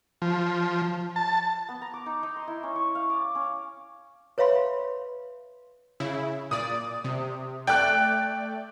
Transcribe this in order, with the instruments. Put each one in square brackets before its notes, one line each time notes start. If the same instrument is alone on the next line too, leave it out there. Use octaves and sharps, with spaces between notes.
[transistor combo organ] F3
A5
[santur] B3
A#5
D6
D#4
D#4
C6
E4
C#4
C#6
F5
D5
C#4
[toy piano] B4 C#5 E5 F5 B5 C6
[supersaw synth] C#3 E4
[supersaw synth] A#2 D5 [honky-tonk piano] D#6
[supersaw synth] C3
[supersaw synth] A3 D5 [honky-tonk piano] G5 F#6